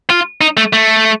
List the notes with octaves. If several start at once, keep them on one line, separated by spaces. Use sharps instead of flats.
F4
D#4
A3
A3